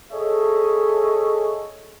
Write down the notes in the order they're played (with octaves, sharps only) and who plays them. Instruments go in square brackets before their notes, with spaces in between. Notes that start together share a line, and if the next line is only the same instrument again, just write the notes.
[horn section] G#4 A4 C#5 D#5 E5